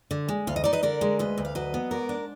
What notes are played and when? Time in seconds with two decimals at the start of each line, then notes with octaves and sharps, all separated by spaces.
0.11 D3
0.29 G#3
0.47 D2 F5
0.56 D#5
0.64 D#4 D5
0.73 B4 D#5
0.83 D3 A#4 D5
1.01 G#3
1.19 D2 B4 D#5
1.38 D2
1.45 F5
1.55 F#3 B4 D#5
1.74 B3
1.91 G#2 A#4 D5
2.09 D4